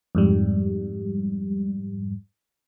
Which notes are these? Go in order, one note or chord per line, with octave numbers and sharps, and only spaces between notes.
F2 G#2 G3